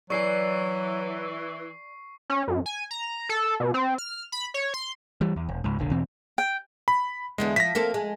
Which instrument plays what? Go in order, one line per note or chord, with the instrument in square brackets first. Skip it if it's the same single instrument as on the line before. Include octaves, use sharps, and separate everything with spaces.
[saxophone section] E3 [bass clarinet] F#3 [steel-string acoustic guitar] D5 G#5 [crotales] C#6 C7
[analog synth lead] C#4
F#2
G#5
A#5
A4
B2
C4
F6
B5
C#5
C6
[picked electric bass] E3 G3
E2
E1
C#2 G#2
F1 A#1 D3
E2 B2 E3 C4
[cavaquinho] G5
[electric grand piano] B5
[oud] E2 D3 B3 [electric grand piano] G#3
[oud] F3 [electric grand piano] A#6 B6
[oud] A#3 C4 A4
G#3